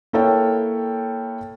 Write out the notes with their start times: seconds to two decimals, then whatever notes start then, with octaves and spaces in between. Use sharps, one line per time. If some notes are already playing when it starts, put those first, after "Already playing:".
0.13 A#3 E4 A4 C#5 G5